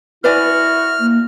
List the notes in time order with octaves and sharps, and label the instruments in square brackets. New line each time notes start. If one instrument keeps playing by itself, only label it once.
[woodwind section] E4 F#4 [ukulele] B4 D5 G#5 [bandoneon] F6
[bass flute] A#3